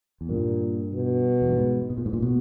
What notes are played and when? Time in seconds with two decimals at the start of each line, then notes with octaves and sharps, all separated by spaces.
0.21 E2
0.29 G2 A#2
0.93 B2
1.42 E2
1.50 G2
1.58 G#2
1.90 B2
1.98 A#2
2.06 G#2
2.13 A#2
2.22 B2